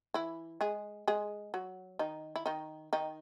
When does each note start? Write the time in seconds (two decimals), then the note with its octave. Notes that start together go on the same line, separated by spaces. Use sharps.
0.14 E3 E4
0.61 G#3 G#4
1.08 G#3 G#4
1.54 F#3 F#4
1.99 D#3 D#4
2.36 E4
2.46 D#3 D#4
2.93 D#3 D#4